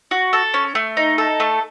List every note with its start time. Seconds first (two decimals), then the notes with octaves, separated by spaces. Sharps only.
0.11 F#4
0.33 A4
0.54 C#4
0.75 A3
0.97 D#4
1.18 A4
1.40 A3